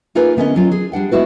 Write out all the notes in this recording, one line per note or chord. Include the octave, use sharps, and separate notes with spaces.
A#3 D#4 F4 G#4 A#4 B4
D3 B3 C#4 A#4 D#5
F#3 C#4 F4
G#4
G3 D4 F#5 G5
G#3 B3 E4 F#4 B4